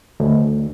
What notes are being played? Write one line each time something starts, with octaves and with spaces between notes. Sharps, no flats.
D2